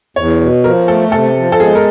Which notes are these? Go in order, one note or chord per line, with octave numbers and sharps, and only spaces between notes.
E2 C#5
B2
F3 A#4
A3 A4
C3 A4
F3
A4
G#3 G#4
A#4